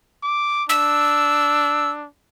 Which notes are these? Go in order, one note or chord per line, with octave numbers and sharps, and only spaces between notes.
D6
D4 E6